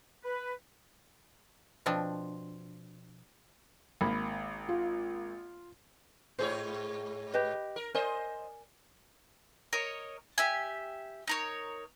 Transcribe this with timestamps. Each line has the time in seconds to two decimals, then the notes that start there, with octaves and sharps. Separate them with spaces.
0.24 B4
1.86 B2 F3 C4 D4
4.01 G#1 A#3 B5
4.69 F4
6.39 G#2 G#4 C5 C#5
7.34 G4 B4 D#5
7.76 A#4
7.95 A#4 C5 D5 D#5 G#5
9.73 A#4 C#5 D#5
10.38 G4 E5 G#5
11.27 D#4 A#4 C#5